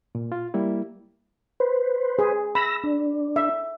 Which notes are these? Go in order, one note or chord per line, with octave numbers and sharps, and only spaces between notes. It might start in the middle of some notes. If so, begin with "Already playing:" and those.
A#2
F4
G3 A#3 E4
B4 C5
G#4
B5 E6 A#6
D4
E5